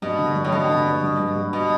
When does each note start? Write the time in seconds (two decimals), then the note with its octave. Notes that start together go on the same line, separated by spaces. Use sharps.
0.02 G2 B2
0.19 D3
0.36 G2
0.45 A2
0.52 G2 B2
0.69 D3
0.85 G2
1.03 G2
1.19 G2
1.36 G2
1.53 B2